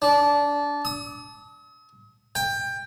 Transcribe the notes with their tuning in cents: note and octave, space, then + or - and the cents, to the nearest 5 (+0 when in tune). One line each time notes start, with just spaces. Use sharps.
D4 -20
D#6 +45
G5 +20